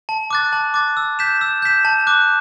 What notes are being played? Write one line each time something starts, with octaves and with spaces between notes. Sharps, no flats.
A5
D6 F#6 A6
A5
D6 F#6 A6
E6
G6 B6 E7
E6
G6 B6 E7
A5
D6 F#6